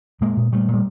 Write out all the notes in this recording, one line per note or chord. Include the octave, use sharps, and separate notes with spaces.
A#2 G#3 A#3
A#2
A#2 G3 A3
A#2
G3